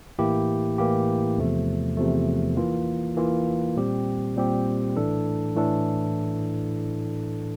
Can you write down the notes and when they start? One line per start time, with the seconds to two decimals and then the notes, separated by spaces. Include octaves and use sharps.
0.19 A2 E3 A#3 E4 G4
0.78 A2 E3 A#3 E4 G4
1.38 E2 C3 F3 A3
1.97 E2 C3 F3 A3
2.57 E3 A#3 F4
3.17 E3 A#3 F4
3.76 A#2 G3 C4 G4
4.36 A#2 G3 C4 G4
4.96 A2 E3 A3 D4 A4
5.56 A2 E3 A3 D4 A4